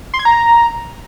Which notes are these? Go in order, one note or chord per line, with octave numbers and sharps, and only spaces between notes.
C6
G#6
A#5